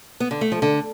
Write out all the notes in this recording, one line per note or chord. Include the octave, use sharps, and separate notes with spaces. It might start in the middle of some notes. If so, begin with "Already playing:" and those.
B3
D3
A3
F3
D3